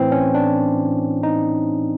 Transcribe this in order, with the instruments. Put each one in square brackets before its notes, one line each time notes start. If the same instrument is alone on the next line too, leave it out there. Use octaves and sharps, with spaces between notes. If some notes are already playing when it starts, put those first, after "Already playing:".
Already playing: [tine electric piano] A2 E3 C4
C#4
D4
D#4